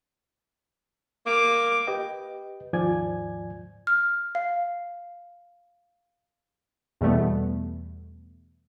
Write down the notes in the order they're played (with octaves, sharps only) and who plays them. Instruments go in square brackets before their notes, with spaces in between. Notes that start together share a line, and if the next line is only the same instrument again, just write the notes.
[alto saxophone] A#3 [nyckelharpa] D6
[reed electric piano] G4 B4 D#5 G5
D#2 G#2 F3 D5 G#5 G#6
[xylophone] F6
F5
[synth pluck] E2 B2 G3 A3 B3